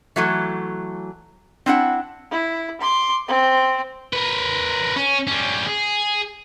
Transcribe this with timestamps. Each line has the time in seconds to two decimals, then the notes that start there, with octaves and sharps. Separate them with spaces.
0.16 E3 F#3 A3
1.66 C4 D4 E4 F#5
2.31 E4
2.81 C6 D6
3.27 C4 C5
4.13 A#4 B4
4.96 C#4
5.27 G3 C#4
5.66 G#4